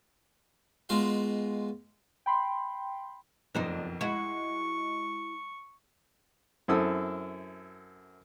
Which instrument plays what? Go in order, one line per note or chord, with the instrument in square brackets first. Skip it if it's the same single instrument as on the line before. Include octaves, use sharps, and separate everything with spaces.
[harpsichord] B2 G#3 F4 F5
[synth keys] G5 B5 C6
[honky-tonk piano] F#1 B1 F2 [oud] D4 D#4 C5
[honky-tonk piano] G#3 [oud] E4 F#4 [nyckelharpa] C#6
[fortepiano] F#2 C4 E4 A4 D#6 E6